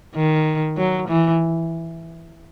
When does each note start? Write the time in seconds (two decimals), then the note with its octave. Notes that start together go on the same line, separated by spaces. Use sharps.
0.15 D#3
0.77 F#3
1.08 E3